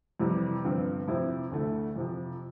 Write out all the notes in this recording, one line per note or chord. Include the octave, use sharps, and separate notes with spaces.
F2 C3 E3 G3
G1 G2 F3 C4
F2 C3 F3 C4 E4
D2 D3 A3 E4
F2 C3 F3